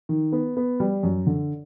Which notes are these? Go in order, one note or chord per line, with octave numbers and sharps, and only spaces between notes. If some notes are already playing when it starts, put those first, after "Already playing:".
D#3
B3
B3
G3
F#2
D3